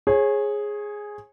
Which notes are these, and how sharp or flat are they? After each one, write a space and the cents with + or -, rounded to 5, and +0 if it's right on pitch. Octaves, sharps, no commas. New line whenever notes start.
G#4 +0 C#5 -30